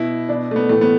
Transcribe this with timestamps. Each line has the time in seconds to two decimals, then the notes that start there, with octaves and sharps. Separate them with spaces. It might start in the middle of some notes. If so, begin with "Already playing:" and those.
Already playing: B2 E4
0.29 B2 D4
0.51 A3
0.56 B3
0.69 A2 E3 A3
0.81 B3